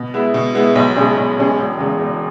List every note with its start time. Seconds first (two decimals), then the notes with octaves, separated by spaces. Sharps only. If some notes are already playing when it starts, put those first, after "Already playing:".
Already playing: B2
0.14 G#3 B3 E4
0.34 B2
0.55 G#3 B3 E4
0.76 B1
0.96 B2 G#3 C#4 G#4
1.17 B1
1.37 B2 G#3 C#4 G#4
1.58 E1
1.79 E2 C#3 G#3
1.99 E1